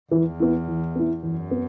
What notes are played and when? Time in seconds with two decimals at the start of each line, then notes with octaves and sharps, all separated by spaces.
0.11 E2 E3
0.40 B3 E4
0.68 E3
0.96 B3 E4
1.23 F#2 E3
1.51 B3